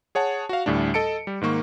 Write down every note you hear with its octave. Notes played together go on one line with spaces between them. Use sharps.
G#4 C#5 F#5 A5
F#4 F5
D2 A2 G3 D4
A4 D#5 A5 C#7 D7
G3
G#2 D#3 A#3 C#6